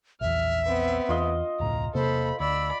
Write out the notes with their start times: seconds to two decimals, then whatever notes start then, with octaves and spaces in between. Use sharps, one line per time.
0.21 A#1 E2 E5 F6
0.66 B3 C4
1.09 E2 F4 D#5
1.60 E1 C#2 A2 A#5
1.94 E1 C3 A#3 A4 C5 B5
2.40 D2 D5 B5 E6